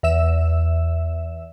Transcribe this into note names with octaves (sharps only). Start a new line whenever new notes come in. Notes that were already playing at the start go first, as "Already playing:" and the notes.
E2 E5 E6 E7